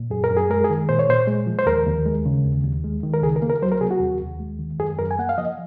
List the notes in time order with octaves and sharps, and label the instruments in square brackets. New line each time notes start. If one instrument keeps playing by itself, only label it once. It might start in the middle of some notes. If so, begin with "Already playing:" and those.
Already playing: [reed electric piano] A#2
F#2 G#4
A#4
F#2
G#4
G#3 A#4
G#4
D#3
A#2 C5
C#5
A#2 C5
G#3
F3
C5
D#2 A#4
D#2
G#3
C#3
D#2
D#2
G#3
D#3
A#4
C#2 G#4
A#4
A#3
A#4
F#3 C5
A#4
C3 G#4
F#4
D#2
D#2
G#3
D#3
F#2 G#4
F#2 A#4
G#5
A#3 F#5
F5
F3 D#5